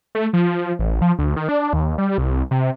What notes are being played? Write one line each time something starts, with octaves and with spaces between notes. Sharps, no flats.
A3
F3
A1
F3
D2
D#3
D4
D#2
G3
C2
C3